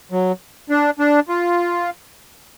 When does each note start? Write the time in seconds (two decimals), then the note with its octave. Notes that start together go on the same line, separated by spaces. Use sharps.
0.12 F#3
0.70 D4
0.99 D4
1.29 F4